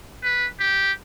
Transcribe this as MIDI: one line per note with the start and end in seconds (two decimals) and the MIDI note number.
0.23 0.47 71
0.60 0.92 67